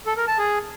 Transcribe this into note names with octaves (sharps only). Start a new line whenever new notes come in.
A4
A#4
A5
G#4